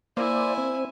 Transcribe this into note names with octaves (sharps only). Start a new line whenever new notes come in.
A#3 E4 C5 D5 G#5
C4